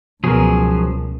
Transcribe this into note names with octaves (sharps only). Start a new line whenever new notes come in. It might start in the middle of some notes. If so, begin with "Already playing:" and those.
C#2 B2 F3 F#3 G#4 A#4